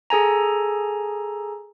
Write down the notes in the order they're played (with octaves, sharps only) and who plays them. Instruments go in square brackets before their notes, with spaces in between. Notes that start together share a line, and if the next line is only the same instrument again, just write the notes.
[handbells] G#4 A4 G#5 A#5